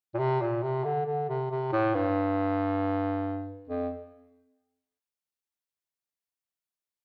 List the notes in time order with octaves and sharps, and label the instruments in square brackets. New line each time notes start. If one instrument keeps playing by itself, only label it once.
[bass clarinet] A#2
C3
A#2
C3
D3
D3
C3
C3
A2
G2
F2